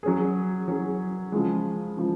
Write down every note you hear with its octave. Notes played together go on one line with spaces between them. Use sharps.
F#3 C#4 G#4
F#3 C#4 G#4
C#3 F3 G#3
C#3 F3 G#3